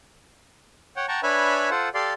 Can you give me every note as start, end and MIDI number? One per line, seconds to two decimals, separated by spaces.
0.96 1.06 73
0.96 1.06 78
0.96 1.06 79
1.08 1.20 78
1.08 1.20 79
1.08 1.20 81
1.08 1.20 82
1.08 1.20 85
1.23 1.70 62
1.23 1.70 71
1.23 1.70 73
1.23 1.70 76
1.23 1.70 80
1.23 1.70 83
1.71 1.89 65
1.71 1.89 69
1.71 1.89 72
1.71 1.89 78
1.94 2.13 67
1.94 2.13 69
1.94 2.13 74
1.94 2.13 77
1.94 2.13 84